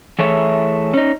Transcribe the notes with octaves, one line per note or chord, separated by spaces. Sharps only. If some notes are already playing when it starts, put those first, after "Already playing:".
E3 A3 G#4 C#5 E5
C#4 D#4